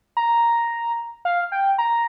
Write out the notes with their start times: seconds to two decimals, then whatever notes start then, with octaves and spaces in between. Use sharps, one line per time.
0.17 A#5
1.25 F5
1.52 G5
1.78 A#5